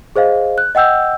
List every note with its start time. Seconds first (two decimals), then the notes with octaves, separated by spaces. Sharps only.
0.16 G#4 C5 D#5 F5
0.58 F#6
0.75 D#5 F#5 G5 E6 G6